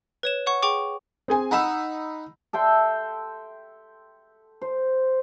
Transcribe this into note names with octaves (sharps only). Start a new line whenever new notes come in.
B4 C#5 E7
C#5 F#5 C#6
G#4 G5 C#6 D6
C4 G#4 G#5
D#4 F#5 A#5 B5 E6
A4 E5 G5 C6
C5